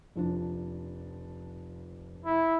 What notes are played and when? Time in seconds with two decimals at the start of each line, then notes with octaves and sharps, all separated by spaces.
0.16 F1 F3 D4
2.25 E4